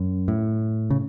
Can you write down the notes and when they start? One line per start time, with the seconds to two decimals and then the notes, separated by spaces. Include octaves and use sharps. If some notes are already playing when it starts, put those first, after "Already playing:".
Already playing: F#2
0.28 A2
0.90 C#3